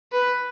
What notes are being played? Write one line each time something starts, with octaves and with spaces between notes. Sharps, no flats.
B4